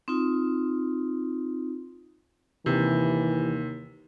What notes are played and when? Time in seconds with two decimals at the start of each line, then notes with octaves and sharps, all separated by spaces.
0.08 C4 D#4 F4
2.66 D#2 C3 E3